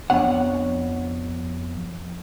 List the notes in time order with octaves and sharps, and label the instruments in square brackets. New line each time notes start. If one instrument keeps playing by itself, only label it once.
[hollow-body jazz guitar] F2 B3 D4 C#5 F#5